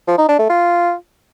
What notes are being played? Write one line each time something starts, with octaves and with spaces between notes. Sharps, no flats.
F3
D#4
D4
A3
F4